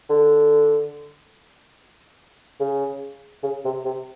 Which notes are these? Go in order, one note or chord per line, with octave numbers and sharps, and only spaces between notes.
D3
C#3
C#3
C3
C3